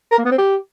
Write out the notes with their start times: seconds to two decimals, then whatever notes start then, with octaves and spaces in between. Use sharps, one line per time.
0.12 A#4
0.18 A#3
0.25 B3
0.32 C4
0.38 G4